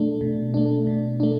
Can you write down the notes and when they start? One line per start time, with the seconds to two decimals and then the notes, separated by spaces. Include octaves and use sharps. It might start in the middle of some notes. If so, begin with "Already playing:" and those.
Already playing: B2 A3 D4
0.21 B2
0.54 A3 D4
0.87 B2
1.20 A3 D4